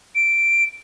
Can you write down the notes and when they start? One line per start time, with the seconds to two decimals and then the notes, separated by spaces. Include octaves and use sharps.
0.15 D7